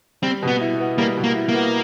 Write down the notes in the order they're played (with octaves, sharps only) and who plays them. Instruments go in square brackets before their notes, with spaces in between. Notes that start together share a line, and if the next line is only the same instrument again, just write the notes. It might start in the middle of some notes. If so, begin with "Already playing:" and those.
[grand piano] G3 [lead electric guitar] C4
[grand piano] B2
[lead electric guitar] B3
[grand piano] E4
B3
[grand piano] G3 [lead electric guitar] A#3
[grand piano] B2
[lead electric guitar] A#3
[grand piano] E4
[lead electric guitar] A#3
[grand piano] B3